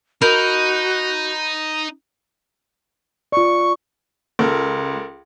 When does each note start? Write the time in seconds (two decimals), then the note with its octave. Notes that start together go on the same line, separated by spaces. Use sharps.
0.22 D#4 F#4 A#4 B5 G6
3.32 F4 D5 C#6
4.39 C#2 A4 A#4